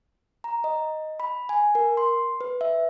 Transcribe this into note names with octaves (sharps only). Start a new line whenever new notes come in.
A#5
D#5
B5
G#5
A#4
C6
B4
E5